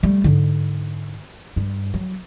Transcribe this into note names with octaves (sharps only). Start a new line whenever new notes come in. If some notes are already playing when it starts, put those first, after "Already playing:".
G3 A3
G#2 D3
G2
F#3